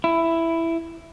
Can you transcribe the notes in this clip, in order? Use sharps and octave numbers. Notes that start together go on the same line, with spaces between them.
E4